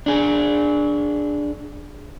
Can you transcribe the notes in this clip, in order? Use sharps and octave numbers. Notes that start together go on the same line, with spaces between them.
D4 G#4